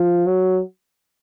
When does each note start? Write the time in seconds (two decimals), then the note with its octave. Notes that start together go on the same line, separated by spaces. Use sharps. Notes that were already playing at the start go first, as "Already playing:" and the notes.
Already playing: F3
0.26 F#3